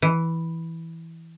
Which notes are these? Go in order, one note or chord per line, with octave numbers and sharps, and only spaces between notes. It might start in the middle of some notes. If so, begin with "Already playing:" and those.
E3